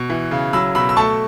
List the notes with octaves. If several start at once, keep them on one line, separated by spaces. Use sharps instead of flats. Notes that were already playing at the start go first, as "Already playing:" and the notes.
Already playing: B2
E3
C#3
F#3 B5 E6
B2 B5 E6
E6
A3 A5 C#6